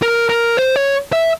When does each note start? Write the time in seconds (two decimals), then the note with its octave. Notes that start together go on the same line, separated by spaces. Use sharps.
0.02 A#4
0.29 A#4
0.57 C5
0.76 C#5
1.13 E5